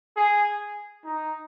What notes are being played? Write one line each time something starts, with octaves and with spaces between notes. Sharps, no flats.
G#4
D#4